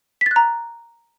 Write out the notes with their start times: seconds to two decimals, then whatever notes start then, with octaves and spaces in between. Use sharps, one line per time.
0.21 B6
0.26 A6
0.31 F#6
0.36 A#5